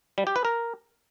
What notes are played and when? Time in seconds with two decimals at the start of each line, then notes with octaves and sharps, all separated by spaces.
0.18 G3
0.27 G4
0.36 B4
0.45 A#4